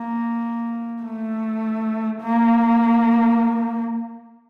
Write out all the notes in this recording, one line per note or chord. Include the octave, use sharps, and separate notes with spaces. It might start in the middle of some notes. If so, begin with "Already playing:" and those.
Already playing: A#3
A3
A#3